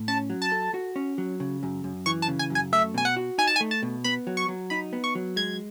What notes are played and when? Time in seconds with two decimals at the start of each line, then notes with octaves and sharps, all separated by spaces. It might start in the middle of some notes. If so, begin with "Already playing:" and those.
Already playing: A2
0.08 C#4 A5
0.30 F#3
0.42 A5
0.52 A4
0.74 F#4
0.96 C#4
1.18 F#3
1.40 C#3
1.63 F#2
1.84 F#2
2.06 E3 C#6
2.22 A5
2.28 C#3
2.39 G#5
2.50 F#2
2.55 G#5
2.73 A3 E5
2.94 B2 G#5
3.05 F#5
3.17 F#4
3.38 D#4 G#5
3.47 A5
3.56 G#5
3.61 A3
3.71 A5
3.83 B2
4.04 B3 B5
4.27 F#3
4.37 C#6
4.49 F#3
4.70 D#4 B5
4.93 B3
5.04 C#6
5.15 F#3
5.36 G#3 G#6